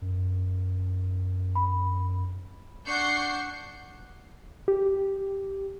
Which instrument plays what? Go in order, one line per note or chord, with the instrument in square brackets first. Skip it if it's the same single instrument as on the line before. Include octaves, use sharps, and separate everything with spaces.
[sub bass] F#2
[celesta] B5
[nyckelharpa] D4 F#5 [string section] C#6 G6 C7
[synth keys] G4